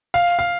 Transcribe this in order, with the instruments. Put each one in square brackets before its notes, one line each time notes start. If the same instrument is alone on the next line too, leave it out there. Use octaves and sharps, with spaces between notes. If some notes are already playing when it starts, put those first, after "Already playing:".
[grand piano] F5
F5